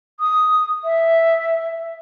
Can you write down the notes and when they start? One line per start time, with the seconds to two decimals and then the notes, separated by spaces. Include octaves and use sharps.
0.20 D#6
0.85 E5